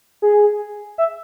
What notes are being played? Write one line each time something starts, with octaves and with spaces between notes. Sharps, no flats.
G#4
E5